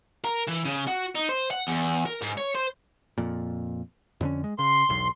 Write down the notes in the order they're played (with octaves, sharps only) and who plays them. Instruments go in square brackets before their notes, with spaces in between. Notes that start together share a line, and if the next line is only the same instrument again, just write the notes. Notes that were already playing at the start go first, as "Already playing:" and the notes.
[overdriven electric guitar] A#4
E3
C#3
F#4
D#4
C5
F#5
E2
A#4
G#2
C#5
C5
[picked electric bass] F2 A#2
F2 D3 C#4
G#3
[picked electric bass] C#3 [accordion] C6
[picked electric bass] E1 B1